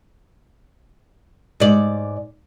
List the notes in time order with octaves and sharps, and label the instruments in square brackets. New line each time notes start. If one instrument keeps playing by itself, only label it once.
[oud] G#2 D5